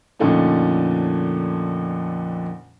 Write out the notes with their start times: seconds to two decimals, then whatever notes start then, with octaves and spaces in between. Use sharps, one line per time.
0.19 F2 A#2 D3 A3 C#4 D#4